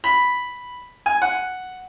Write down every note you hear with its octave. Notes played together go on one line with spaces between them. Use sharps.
B5
G#5
F#5